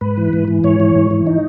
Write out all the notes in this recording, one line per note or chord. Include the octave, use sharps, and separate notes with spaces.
G#2 B4
E3
G#2
E3
G#2 C#5
E3
G#2
E3
D#4